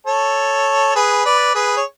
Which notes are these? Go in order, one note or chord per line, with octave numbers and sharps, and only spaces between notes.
A4 C#5
G#4 B4
B4 D5
G#4 B4
C#5